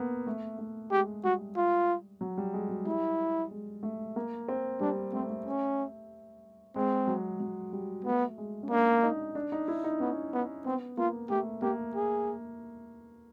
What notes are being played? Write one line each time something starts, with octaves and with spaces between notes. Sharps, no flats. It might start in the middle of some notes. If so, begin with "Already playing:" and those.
Already playing: A#3 B3
A3
A3
G#3 G4
G3 F#4
F4
F#3
G3
G#3
F#3
G3 E4
G#3
A3
A#3
C4
G3 D4
A3 C4
A3
C#4
G#3 C4
F#3
F#3
G3
A3 B3
G#3
C#4
A#3 D4
D#4
D4
D#4
E4
D#4
B3 C#4
B3
B3 C4
A#3 F4
A3 G4
A#3 G4
G#4